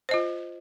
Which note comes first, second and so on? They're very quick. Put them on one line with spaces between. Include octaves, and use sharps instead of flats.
C5 D#5 F4